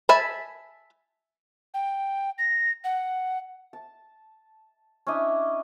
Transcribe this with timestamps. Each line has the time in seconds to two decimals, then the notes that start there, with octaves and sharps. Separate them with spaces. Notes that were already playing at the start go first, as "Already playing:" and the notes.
0.09 E5 G#5 A5 B5
1.74 G5
2.38 A#6
2.84 F#5
3.73 A5
5.07 C#4 D4 E4 D#5